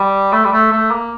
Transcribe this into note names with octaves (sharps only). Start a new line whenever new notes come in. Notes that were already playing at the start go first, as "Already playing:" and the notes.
Already playing: G3
A3
G3
A3
A3
A#3